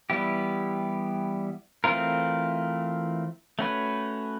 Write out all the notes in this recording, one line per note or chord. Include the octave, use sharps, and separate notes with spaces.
E3 G3 B3 E4 G4
E3 A3 C4 F4 A#4
A3 C#4 F#4 B4